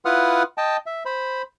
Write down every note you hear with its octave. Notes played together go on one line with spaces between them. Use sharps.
E4 F4 B4 F#5 D#6 F6
D#5 G5 A5
E5
C5 B5